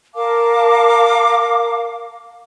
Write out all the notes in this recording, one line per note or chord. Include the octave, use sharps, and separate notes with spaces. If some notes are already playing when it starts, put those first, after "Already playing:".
A#4 F5 A5 D6